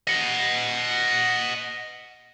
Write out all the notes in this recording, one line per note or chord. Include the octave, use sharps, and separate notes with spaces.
D#5 F#5